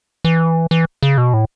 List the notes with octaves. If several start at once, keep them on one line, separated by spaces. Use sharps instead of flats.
E3
E3
C#3
B2
A2